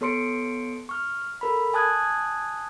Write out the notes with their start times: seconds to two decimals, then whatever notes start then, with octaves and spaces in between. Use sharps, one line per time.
0.01 B3 A4 C#5 C6 C#7 D7
0.89 C#6 F6
1.41 A4 A#4 B5
1.74 G#5 A5 D#6 F#6 G#6